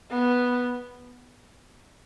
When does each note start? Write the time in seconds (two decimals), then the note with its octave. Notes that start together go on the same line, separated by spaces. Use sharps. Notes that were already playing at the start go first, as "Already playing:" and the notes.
0.10 B3